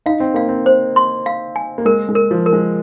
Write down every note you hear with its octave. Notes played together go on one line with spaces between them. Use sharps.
D#4 F5
C4
A#3 F5
C4
C5
C6
F5
G#5
A#3
G#3 A#4
G#3
A#4
F3
A#4
G#3